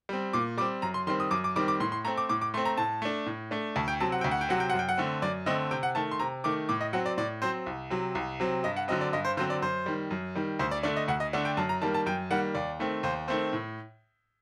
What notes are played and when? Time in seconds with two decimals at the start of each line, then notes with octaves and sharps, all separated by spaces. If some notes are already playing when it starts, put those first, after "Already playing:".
0.09 G3 C4
0.33 A#2 D6
0.58 G3 D6
0.61 C4
0.82 F#2 A#5
0.94 C6
1.07 D#3 G3 C4 C6
1.20 D#6
1.31 F#2 D6
1.44 D6
1.56 D#3 G3 C4 D6
1.68 D6
1.80 A2 C6
1.92 C6
2.05 A3 C4 A#5
2.17 D6
2.29 A2 D6
2.41 D6
2.54 A3 C6
2.57 C4
2.65 A#5
2.78 A2 A5
3.02 A3 D4
3.26 A2
3.51 A3 D4
3.76 D2 A5
3.88 G5
4.00 C3 F#3 C4 A5
4.12 F#5
4.21 D2 G5
4.31 F#5
4.41 G5
4.49 C3 F#3 C4 F#5
4.60 G5
4.70 F#2 F#5
4.79 G5
4.89 F#5
4.98 D3 A3 C4
5.22 F#2 D5
5.46 D3 A3 C4 D#5
5.71 C3 G5
5.83 F#5
5.95 D#3 A3 A5
6.11 C6
6.20 C3 A#5
6.44 D#3 A3 D6
6.69 A2 D6
6.81 D#5
6.93 F#3 C4 F#5
7.06 D5
7.18 A2 D5
7.42 F#3 C4 C5
7.66 C2
7.90 C3 F#3 C4
8.15 C2
8.40 C3 F#3 C4
8.64 G2 D#5
8.76 F#5
8.88 D3 F#3 C4 D#5
9.01 D5
9.13 G2 D#5
9.25 C5
9.37 D3 F#3 C4 C5
9.50 D5
9.62 F#2 C5
9.86 D#3 G3
10.11 F#2
10.35 D#3 G3
10.59 D2 C5
10.71 D5
10.83 D3 A3 D4 D5
10.97 D#5
11.08 D2 F#5
11.20 D#5
11.33 D3 A3 D4 F#5
11.45 G5
11.57 F#2 A5
11.69 A#5
11.82 D#3 G3 A#3 A5
11.94 A5
12.06 F#2 G5
12.30 D#3 G3 A#3 F#5
12.55 D#2 D5
12.80 D#3 A3 C4
13.03 D#2 C5
13.28 D#3 A3 C4 C5
13.53 A2